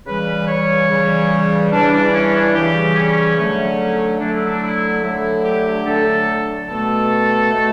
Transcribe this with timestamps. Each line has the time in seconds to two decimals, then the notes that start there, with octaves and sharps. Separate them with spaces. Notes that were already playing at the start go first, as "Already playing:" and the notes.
0.07 C#3 E3 G3 B4
0.47 C#5
0.89 C#3 E3 G3
1.72 C#3 E3 G3 D4
1.93 D4
2.13 C#4
2.35 D4
2.55 C#3 E3 G3 G4
2.96 C#4
3.38 D3 F#3 A3 C#4
4.20 D3 F#3 A3 D4
4.34 E4
4.47 D4
4.62 E4
5.03 D3 F#3 A3 E4
5.44 G4
5.86 D3 F#3 A3 A4
6.68 B2 A3 A4
7.52 B2 A3